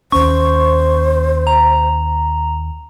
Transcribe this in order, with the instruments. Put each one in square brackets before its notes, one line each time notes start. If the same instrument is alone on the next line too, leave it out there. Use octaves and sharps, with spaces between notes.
[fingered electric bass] D#2 C#4 [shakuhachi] C5 [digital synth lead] C#6
[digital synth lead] A#5